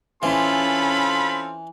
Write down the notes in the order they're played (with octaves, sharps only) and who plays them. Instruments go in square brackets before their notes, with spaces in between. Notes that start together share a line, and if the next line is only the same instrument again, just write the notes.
[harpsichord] E3 [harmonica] C4 F4 A4 [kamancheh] C#4 [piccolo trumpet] B5